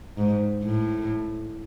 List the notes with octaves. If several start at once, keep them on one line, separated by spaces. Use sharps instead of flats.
G#2
A2